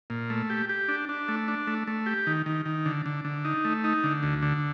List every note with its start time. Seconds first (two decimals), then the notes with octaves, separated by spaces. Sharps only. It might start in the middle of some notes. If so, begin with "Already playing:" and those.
0.10 A#2
0.30 A3
0.50 G4
0.69 G4
0.88 D4
1.09 D4
1.28 A3
1.48 D4
1.67 A3
1.87 A3
2.06 G4
2.27 D#3
2.46 D#3
2.65 D#3
2.86 D3
3.06 D3
3.25 D3
3.45 D#4
3.65 A3
3.84 D#4
4.04 D3
4.23 D2
4.42 D3